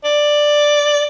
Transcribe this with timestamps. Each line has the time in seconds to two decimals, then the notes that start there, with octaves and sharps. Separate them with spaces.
0.04 D5